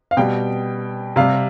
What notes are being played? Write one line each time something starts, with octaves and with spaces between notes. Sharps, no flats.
F5
B2 G3 G5
C3 G3 F5